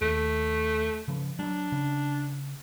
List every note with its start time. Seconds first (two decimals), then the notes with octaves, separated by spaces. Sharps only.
0.01 D#2 A3
1.08 C#3 F3
1.39 F#3 G3 D4
1.72 C#3